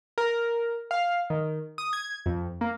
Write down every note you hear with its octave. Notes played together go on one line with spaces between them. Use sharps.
A#4
F5
D#3
D#6
G#6
F2
A#3